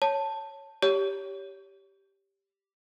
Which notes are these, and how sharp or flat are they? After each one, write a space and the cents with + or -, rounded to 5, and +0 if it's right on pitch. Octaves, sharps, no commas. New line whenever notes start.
C#5 +0 A5 +5
G4 +0 C#5 +15